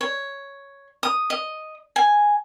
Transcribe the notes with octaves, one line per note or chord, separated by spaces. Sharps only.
C#5
D#6
D#5
G#5